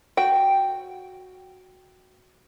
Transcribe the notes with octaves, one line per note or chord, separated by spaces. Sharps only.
F#4 G5